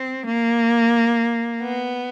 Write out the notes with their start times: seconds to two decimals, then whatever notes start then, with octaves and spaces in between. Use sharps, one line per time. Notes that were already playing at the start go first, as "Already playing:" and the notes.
Already playing: C4
0.26 A#3
1.60 B3